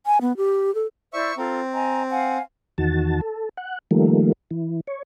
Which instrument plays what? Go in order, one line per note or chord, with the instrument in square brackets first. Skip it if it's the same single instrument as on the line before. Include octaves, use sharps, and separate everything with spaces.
[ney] G#5
B3
G4
A4
[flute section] E4 C5 D5 [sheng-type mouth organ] E5 C#6
[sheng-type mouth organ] C4 [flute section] F4 A4 A#5
[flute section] D#5 G#5 A#5
F5 F#5 G#5
[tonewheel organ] E2 D#3 F#4 A5
A4
F#5
D#3 F3 G3 A3 A#3
E3
C#5